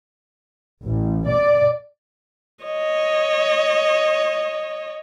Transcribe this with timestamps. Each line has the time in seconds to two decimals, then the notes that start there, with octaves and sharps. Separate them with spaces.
0.85 A1
1.27 D5
2.65 C#5 D#5